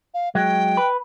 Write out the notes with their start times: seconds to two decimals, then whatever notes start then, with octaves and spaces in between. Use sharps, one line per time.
0.14 F5
0.35 F#3 G#3 G5
0.77 B4